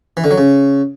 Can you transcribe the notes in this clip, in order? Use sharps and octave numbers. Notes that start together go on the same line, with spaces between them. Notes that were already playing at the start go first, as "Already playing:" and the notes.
E3
D3
F#3
C#3